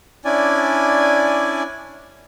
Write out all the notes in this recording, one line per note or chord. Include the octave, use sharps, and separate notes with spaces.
C#4 D4 E4 D5 G#5